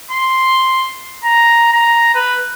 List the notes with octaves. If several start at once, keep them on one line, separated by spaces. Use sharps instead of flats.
C6
A#5
A#5
B4